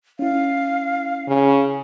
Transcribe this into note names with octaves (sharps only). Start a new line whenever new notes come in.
C#4 E4 F5
C#3